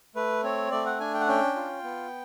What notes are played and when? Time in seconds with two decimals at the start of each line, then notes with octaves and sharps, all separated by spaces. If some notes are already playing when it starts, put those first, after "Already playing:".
0.15 A3 B4
0.43 C4 C#5
0.71 A3 D5
0.86 F#5
1.00 D4 G#5
1.14 G5
1.21 F#5
1.27 C#4 G5
1.56 F4
1.84 B3